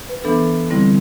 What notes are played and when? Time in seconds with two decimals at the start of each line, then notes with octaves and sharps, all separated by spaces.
0.09 B4
0.24 E3 B3 D4 A4
0.70 D3 G3 C4 E4